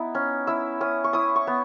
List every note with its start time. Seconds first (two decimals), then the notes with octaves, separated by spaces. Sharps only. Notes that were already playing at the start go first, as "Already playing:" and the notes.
Already playing: B3 D#4 E4
0.15 C#4
0.47 E4 E6
0.81 C#4 D#6
1.04 C#6
1.13 E4 D#6
1.36 C#6
1.47 B3